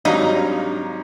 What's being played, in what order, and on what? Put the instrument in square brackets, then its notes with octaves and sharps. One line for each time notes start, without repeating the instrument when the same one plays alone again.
[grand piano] G#1 F#3 G3 [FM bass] D4 [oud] D#4 [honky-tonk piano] F5 A#5